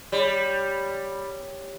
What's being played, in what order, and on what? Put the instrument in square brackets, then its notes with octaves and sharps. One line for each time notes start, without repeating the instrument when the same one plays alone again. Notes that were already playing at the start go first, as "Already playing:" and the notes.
[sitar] G3 [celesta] C#5